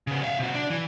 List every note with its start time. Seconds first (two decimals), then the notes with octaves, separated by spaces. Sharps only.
0.07 C#3 B3
0.23 E5 F5
0.39 C3 F#4
0.55 D4
0.70 E3